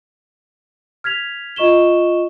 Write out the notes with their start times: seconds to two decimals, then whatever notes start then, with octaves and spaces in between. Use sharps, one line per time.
1.04 F6 G#6 B6 F7
1.56 F4 D#5 C#6 E7 G7